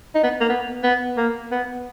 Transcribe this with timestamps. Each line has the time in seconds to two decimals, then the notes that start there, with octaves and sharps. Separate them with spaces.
0.15 D#4
0.23 B3
0.41 A#3
0.49 B3
0.83 B3
1.17 A#3
1.51 B3